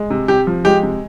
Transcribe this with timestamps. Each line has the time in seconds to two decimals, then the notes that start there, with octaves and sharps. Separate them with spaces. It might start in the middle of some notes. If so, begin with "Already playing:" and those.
Already playing: G#3
0.10 C3
0.28 C3 G4
0.47 F3
0.65 G#3 G4
0.83 C3